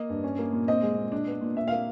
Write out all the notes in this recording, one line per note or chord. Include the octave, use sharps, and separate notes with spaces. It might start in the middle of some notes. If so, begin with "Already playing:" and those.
Already playing: A#3 D#5
G2
C#4
A#3
A#2
C4 D#5
G#3
A#2
D4
B3
A#2
A#2 E5
A#3 F5